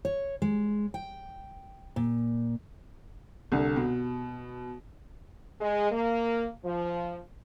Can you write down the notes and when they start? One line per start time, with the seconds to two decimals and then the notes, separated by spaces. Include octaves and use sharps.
0.05 C#5
0.42 G#3
0.94 G5
1.96 A#2
3.52 C2 D3
3.76 B2
5.60 G#3
5.92 A#3
6.65 F3